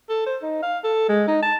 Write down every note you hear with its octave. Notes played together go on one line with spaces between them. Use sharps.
A4
C5
D#4
F5
A4
G#3
D#4
A5